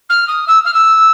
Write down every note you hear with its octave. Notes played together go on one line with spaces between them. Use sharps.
F6
D#6
E6
F6
E6